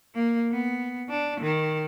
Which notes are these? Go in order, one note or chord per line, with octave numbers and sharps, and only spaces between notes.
A#3
B3
D4
D#3